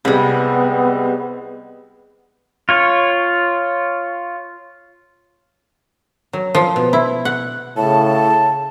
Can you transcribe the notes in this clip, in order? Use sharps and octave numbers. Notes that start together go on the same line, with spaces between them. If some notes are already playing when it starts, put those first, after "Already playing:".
C2 C3 G3 G#3 B3
F4 C#5
F#3
F3
B2
E4
F#5
A2 C#3 A5